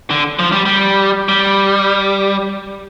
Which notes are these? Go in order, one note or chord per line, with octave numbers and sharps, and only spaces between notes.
D3
F3
G3
G3
G3